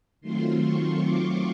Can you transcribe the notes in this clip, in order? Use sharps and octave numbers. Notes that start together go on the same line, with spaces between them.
D#3 F#3 A3 C4 F4 C6
C#6
D6